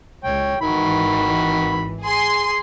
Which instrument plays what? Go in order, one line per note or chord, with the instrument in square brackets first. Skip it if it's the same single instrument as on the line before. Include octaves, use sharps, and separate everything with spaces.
[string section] C#2 [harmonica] C#5 G5
[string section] G#1 E3 [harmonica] D#3 F#4 B5
[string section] G#4 C6